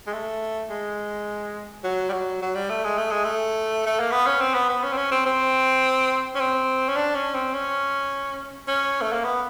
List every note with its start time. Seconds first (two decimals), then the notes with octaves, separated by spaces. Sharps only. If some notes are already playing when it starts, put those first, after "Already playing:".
0.07 G#3
0.13 A3
0.70 G#3
1.84 F#3
2.09 G3
2.13 F#3
2.42 F#3
2.55 G3
2.70 A3
2.85 G#3
2.98 A3
3.11 G#3
3.24 A3
3.86 A3
4.00 A#3
4.12 B3
4.26 C#4
4.41 C4
4.54 B3
4.69 B3
4.84 C#4
4.93 C4
4.97 C#4
5.11 C4
5.26 C4
6.35 C#4
6.40 C4
6.89 C#4
6.96 D4
7.15 C#4
7.35 C4
7.54 C#4
8.68 C#4
9.02 A3
9.13 A#3
9.24 B3